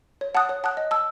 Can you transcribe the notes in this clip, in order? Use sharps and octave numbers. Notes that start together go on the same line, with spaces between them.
C#5
F#5 A5 D#6 F#6
C#5
F#5 A5 D#6 F#6
D#5
A5 E6